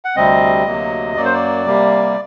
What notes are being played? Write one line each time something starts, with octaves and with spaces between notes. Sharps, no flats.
F#5
D2 C3 G3 C4 D#5
D2 C3 F#3 A#3
F#2 F#3 A#3 D5
C5
D5
C3 G3 A#3